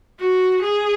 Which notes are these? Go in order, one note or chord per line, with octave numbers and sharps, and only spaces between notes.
F#4
G#4